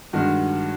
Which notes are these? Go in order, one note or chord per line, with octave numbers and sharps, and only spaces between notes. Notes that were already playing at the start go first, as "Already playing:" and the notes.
G2 D#3 G#3 F#4